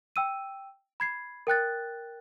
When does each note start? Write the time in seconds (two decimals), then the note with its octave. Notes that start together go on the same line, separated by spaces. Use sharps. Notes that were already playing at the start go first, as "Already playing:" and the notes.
0.16 G5 E6 D#7
1.00 B5 G#6 C7
1.47 A#4 G5 F#6 A6